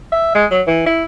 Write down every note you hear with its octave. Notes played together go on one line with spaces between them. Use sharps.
E5
G#3
F#3
E3
E4